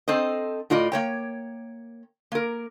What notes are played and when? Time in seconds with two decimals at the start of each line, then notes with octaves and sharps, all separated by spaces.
0.08 C4 A4 C5 D#5
0.70 A2 F4 D5 D#5
0.92 A#3 C#5 G5
2.32 A#3 A#4